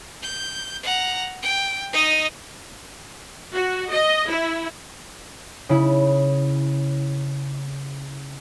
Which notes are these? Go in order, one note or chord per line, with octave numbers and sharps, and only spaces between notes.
G6
F#5 A#5
G5
D#4 D#5
F#4
D#5
E4
C#3 E4